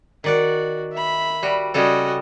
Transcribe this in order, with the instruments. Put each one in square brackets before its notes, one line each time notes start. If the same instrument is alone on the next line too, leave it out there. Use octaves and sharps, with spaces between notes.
[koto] D#3 D5 F#5 [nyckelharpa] F#4
[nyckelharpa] E5 B5
[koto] G3 F#4
[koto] C#3 G3 A4 [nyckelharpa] F#4 D#5